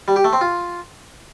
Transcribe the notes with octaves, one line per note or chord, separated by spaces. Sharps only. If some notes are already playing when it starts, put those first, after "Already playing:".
G3
G4
A3
C4
F4